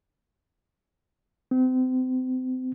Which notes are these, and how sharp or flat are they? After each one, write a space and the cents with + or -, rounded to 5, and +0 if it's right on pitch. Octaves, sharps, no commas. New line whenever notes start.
C4 -35